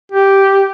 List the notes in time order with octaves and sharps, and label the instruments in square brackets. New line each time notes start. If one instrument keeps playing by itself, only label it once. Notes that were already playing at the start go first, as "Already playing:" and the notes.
[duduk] G4